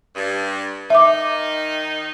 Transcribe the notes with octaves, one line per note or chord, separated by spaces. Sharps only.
G2
D#3 D#4 E5 D6